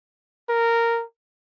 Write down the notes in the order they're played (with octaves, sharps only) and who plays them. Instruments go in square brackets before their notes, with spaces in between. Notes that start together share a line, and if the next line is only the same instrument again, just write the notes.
[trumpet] A#4